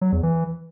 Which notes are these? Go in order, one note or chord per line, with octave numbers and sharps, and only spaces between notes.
F#3
E2
E3